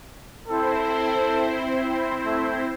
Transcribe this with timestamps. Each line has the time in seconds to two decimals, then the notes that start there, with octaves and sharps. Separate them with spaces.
0.48 C4 E4 A4 C5
2.25 A3